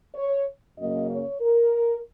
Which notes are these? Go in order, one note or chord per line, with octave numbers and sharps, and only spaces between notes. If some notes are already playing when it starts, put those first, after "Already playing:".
C#5
F#2 C#3 F#3 A#3 D#5
C#5
A#4